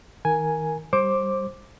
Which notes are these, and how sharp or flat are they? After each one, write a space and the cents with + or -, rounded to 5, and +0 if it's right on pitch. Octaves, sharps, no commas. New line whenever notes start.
D#3 +30 A#4 +0 G#5 +0
G3 -5 C5 +25 D6 +0